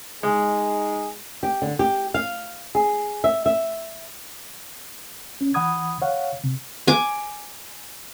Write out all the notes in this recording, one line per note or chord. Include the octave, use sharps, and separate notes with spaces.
G#3 D#4 G#4
G4
D3
G4
F5
G#4
E5
E5
C#4
E3 F#5 B5 D#6 G#6
C#5 F5 F#5
C3
G#5 D6